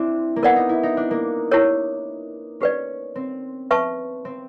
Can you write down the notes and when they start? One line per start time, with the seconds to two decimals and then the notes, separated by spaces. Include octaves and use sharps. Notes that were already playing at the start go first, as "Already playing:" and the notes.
Already playing: C4 D4 E4
0.36 A#3
0.42 B3 A#4 D5 F#5
0.56 D#4
0.69 E4
0.83 D#4
0.97 D4
1.11 A#3
1.51 E4 G4 A#4 C#5
2.60 C#4 G4 B4 D5
3.15 C4
3.70 B3 B4 E5 A5 C#6
4.25 C4